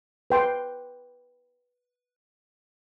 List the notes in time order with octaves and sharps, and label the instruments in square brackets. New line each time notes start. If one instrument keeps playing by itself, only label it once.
[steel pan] B4 G5 C6